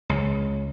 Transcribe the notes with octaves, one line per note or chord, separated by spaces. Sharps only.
C#2